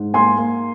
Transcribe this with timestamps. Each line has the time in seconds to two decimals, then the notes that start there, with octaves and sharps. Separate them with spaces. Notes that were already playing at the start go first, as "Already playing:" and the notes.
Already playing: G#2
0.14 A#3 G#5 C6
0.38 A#3